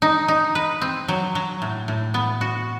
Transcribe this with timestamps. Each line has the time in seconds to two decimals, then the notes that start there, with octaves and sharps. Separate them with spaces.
0.02 D#4
0.28 D#4
0.55 B4
0.81 C4
1.08 F#3
1.35 F#3
1.62 A2
1.88 A2
2.14 B3
2.41 F#4